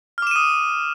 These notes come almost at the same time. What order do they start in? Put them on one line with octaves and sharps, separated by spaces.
F6 D6 E7 D#7 D#6